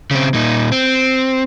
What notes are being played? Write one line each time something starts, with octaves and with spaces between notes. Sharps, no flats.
C#3 C4
A#2 D#4
C4